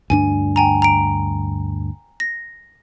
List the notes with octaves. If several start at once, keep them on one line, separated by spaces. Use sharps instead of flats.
D2 G2 D4 G#5
G5 G#5 A#5
A#5 D7
A#6